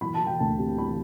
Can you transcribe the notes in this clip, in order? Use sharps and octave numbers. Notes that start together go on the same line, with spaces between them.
E3 B5
A5
E3
G5
D2 A5
C3
E3 B5